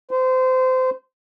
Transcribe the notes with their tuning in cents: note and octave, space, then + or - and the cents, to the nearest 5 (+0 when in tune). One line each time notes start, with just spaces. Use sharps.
C5 -25